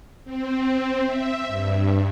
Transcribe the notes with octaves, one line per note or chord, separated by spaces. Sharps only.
C4
E5
G2